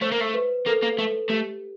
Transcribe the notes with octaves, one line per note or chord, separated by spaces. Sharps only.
A3 C5
A#3
A3
B4
A#3 A4
A#3
A3 A4
A3 G4